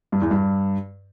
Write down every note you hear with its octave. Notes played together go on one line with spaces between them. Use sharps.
G2
E2
G2